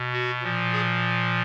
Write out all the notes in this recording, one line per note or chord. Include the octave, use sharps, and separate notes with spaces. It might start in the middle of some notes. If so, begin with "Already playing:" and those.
Already playing: B2
F#4
A#2 F3
G#4